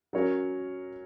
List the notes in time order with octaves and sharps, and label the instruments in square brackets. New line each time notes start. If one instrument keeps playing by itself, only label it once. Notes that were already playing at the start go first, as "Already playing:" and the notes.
[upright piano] F#3 C#4 A#4 C#5